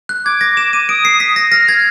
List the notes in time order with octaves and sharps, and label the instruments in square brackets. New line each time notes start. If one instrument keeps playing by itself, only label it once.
[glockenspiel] F#6
[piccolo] D6 [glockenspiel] G#6
[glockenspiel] A#6
E7
D#7
[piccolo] D#6 [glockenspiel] D7
[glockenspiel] C7
B6
A#6
[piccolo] F6 [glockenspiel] A#6
[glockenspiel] G#6